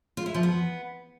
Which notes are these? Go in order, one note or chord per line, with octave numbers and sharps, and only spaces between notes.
F4
E4
F3
B3